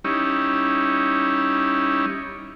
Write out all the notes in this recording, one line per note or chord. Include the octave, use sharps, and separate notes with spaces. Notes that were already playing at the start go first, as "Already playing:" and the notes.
G3 C#4 D#4 E4